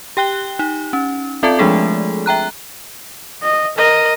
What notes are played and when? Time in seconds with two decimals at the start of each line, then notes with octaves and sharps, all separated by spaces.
0.17 G4 G5 F#6 G7
0.59 D#4
0.93 C#4
1.43 C4 F4 A4 D5 E5 A5
1.59 F3 G#3 A3 D4 G#4 A4
2.26 E5 G5 A#5 F#6
3.42 D#5
3.78 A#4 D#5